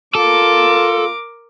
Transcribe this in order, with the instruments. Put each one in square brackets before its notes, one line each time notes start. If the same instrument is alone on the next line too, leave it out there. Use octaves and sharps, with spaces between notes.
[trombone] F4 [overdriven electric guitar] A4 [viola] A#4 D6